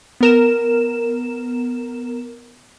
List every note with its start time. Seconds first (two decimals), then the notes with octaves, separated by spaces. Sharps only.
0.21 B3 A#4 E7